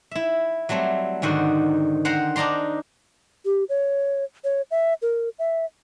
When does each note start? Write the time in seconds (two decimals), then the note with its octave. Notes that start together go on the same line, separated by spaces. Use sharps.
0.11 E4 E5
0.69 F#3 G3 A3 C4
1.22 G#2 D3 D#3 C4 F#4
2.05 C5 F#5 G5 A#5 C6
2.36 D4 D#4 D5 A#5 C6
3.45 G4
3.69 C#5
4.44 C#5
4.71 E5
5.02 A#4
5.39 E5